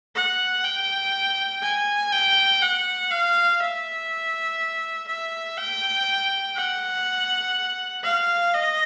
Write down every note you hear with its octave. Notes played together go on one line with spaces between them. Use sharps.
F#5
G5
G#5
G5
F#5
F5
E5
E5
G5
F#5
F5
D#5